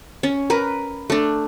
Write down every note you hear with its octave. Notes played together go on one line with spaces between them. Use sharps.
C#4
A#4 B4
A3 D4